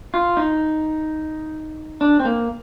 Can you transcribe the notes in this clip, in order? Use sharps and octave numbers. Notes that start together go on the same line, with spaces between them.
F4
D#4
D4
C4
A#3